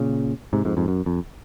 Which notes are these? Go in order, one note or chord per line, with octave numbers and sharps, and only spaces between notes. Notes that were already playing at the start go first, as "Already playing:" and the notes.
Already playing: A#2 C#3
G#2 C3
F2 G#2
F2 G#2
F#2
F2